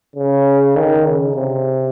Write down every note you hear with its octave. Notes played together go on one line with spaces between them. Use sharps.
C#3
D#3
C#3
C3